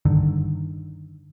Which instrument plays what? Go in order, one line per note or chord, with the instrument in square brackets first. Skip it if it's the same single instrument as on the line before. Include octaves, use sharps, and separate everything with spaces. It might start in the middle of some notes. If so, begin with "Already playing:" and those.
[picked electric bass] G2 D3 D#3